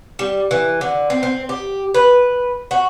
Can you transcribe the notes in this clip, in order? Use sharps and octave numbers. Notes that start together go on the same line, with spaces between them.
G3
E3
D3
C4
C4
G4
B4
F#4